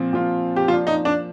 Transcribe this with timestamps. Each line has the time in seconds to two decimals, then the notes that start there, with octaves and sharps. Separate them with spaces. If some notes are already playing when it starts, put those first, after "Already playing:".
Already playing: A#2 F3 C4 F4
0.13 A#2 F3 C4 F4
0.56 G4
0.68 F3 A#3 D4 F4
0.87 D#4
1.05 D4